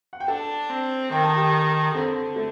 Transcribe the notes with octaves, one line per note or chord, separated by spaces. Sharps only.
F#5
G5
D4 A4 A5
C4
D#3 G5
A5
G4 G5
D3 C4 C5
A3